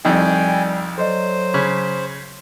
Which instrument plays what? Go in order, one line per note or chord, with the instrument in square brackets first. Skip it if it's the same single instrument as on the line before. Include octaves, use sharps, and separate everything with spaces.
[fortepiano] C2 F2 [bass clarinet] G3 [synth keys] D#4 D#5 [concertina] G5 G#5
[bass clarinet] F#3 [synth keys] A4 D5 D#5 [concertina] C5
[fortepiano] C#3 [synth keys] B5 G#6 B6